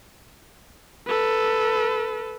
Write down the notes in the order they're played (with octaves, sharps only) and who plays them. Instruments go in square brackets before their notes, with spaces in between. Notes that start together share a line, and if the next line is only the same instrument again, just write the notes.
[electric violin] A4 B4